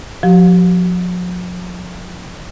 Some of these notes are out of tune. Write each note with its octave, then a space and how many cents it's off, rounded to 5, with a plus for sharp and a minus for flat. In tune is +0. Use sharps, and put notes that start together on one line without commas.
F3 +45 G4 -35